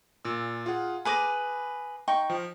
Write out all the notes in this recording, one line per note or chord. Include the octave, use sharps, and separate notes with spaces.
A#2 E6
F4 G#4 F#5
G#4 B4 B5 D6 A#6
D#4 G5 C#6
F3